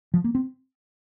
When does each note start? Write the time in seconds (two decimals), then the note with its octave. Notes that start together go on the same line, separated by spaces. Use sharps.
0.14 F3
0.24 A#3
0.35 C4